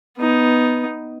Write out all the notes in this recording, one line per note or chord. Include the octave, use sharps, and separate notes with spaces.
B3 D#4